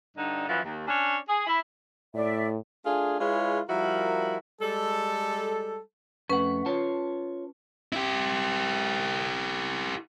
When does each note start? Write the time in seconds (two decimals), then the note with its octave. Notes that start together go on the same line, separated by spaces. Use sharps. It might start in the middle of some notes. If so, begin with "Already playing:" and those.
0.16 G2 D3 D#4
0.47 F#2 E3 F3
0.64 D#2
0.86 C#4 D4 C#5
1.28 G#4
1.47 E4
2.14 A2 D5 E5
2.85 A3 D4 F4 G#4
3.20 G#3 E4 F4 G#4 B4 C#5
3.69 F3 G3 E4 F#4 A#4
4.62 G3 G#3 A4
6.30 F2 A3 C#4 B4 F#5
6.66 F4 C#5 A5
7.92 E4 G4